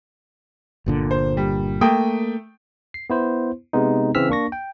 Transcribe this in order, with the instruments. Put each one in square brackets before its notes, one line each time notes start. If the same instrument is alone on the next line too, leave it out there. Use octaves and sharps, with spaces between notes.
[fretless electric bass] G1 A#2 D3
[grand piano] C5
G3
[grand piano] A3 G5 D#6 [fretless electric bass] A#3
[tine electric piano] C7
B3 E4 C5
C3 G#3 B3 D#4
C#3 E3 C4 E6 F6 B6
A#3 D4 C#6 A#6
G5